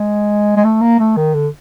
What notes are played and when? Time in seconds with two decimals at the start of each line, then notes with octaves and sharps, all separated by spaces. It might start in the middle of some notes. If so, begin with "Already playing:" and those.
Already playing: G#3
0.56 G#3
0.64 A3
0.81 A#3
0.99 A3
1.17 D#3
1.34 D3